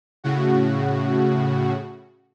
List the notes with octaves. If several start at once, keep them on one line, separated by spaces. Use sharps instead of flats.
A2 C#3 F#4